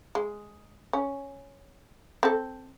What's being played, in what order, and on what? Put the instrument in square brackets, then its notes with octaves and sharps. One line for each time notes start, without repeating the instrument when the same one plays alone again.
[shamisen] G#3
C#4
C4 A4